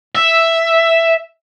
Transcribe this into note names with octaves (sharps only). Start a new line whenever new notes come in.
E5